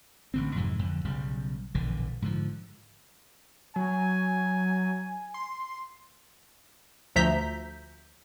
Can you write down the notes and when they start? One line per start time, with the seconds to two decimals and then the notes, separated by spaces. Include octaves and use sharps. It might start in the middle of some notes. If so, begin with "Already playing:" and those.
0.34 A1 D3 C4
0.56 F2 G#2 C3 E3
0.79 F2 D3
1.05 B1 C#3 G3
1.75 E1 A#1 D3 E3
2.22 G#2 D3 F3
3.76 F#3 G#5
5.34 C6
7.16 D2 F3 E5 A#5 G6 B6